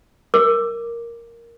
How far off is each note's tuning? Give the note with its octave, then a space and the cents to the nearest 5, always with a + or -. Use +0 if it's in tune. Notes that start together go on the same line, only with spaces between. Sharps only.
A#4 +0 D6 +0